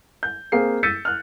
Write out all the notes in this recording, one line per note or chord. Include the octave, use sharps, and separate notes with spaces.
G6
A#3 C4 G#4 F5 C7
E6 G6 A6 B6 C#7 D#7
F6 F#6